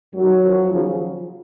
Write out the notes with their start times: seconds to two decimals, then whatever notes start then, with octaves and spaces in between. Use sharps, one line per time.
0.14 F#2 D#3 F#3
0.42 F#2 F3
0.70 D#2 C#3 F3